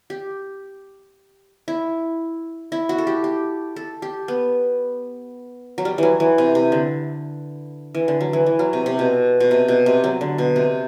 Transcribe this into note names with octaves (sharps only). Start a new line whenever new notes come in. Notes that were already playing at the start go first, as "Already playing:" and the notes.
G4
E4
E4
F#4
A4
G4
G4
A4
G4
B3
F#3
G3
E3 F#3
E3
C3
C3
D3
E3
D3
F#3
E3
E3
F#3
C3
C3
B2
B2
C3
B2
C3
F#3
D3
B2
C3